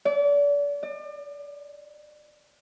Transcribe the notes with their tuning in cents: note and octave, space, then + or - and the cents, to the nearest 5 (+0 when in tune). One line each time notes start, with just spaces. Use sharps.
D5 -35
D5 +35